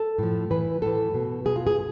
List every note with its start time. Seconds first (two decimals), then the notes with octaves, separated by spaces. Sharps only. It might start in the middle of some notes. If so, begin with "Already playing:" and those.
Already playing: A4
0.18 A2 F3
0.50 A2 E3 B4
0.82 A2 E3 A4
1.14 B2
1.45 B2 G#4
1.56 F4
1.67 G#4